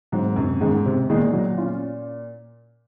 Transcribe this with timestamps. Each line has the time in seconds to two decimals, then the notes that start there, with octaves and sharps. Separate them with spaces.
0.12 G#2 F#3 C4
0.36 F#2 C3
0.61 G#2 D#3 G#3 D#4
0.86 C3
1.10 A#2 D#3 G#3 D#4
1.33 F#3
1.58 C#4 F4